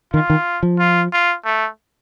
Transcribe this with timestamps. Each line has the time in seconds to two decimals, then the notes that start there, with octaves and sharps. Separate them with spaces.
0.14 D#3 F4
0.30 D#3
0.63 F3
0.79 F4
1.12 F4
1.45 A3